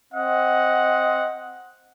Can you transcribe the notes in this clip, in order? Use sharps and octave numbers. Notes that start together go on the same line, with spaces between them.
C4 D#5 F#5